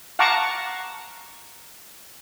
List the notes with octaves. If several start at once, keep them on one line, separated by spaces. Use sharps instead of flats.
F5 F#5 A5 A#5 C#6 D6